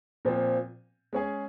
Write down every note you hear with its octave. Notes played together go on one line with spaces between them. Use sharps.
A#2 F3 C4
G#3 C#4 G#4